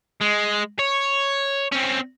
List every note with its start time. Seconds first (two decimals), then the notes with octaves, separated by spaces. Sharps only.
0.21 G#3
0.79 C#5
1.72 C4 C#4